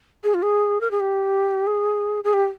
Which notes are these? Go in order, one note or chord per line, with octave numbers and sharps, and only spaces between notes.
G#4
F4
G#4
A#4
G#4
G4
G#4
G#4
G4